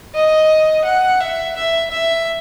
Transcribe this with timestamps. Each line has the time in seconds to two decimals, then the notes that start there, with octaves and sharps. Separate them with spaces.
0.15 D#5
0.85 F#5
1.21 E5
1.56 E5
1.90 E5